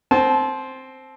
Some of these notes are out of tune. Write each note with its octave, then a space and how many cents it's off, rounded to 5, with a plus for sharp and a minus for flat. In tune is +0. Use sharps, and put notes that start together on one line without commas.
C4 +0 A5 -30